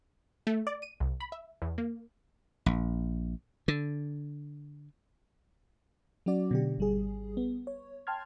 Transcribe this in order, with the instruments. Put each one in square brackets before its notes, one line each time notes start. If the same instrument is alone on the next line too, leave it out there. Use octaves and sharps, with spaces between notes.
[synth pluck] A3
D5
D#7
C2
B5
E5
E2
A#3
[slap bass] A#1
D3
[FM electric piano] F#3 C#4 F#4 D5
B2 D3 G4
G#1 G3 G#4
B3
C#5
G5 A5 C6 F6 G#6